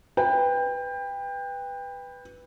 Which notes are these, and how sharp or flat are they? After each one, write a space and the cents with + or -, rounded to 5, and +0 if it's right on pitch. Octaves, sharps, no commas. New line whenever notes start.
B4 +0 G5 +25